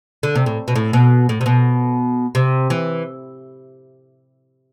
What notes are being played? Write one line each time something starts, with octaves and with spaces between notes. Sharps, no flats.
D3
C3
A2
B2
A2
B2
A2
C3
B2
C3
E3